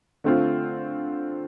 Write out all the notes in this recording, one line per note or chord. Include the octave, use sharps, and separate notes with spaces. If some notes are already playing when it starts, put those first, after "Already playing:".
D3 A3 C4 F4